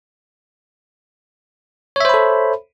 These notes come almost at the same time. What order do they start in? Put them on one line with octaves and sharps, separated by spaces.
C#5 E5 C5 B5 A4